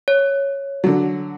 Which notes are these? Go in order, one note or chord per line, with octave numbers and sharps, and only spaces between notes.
C#5
D3 F#3